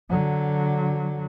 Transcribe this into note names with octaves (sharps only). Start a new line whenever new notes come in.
D3 F#3